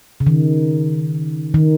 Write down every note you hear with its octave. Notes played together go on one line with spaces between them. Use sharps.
C#3
D#3
D#3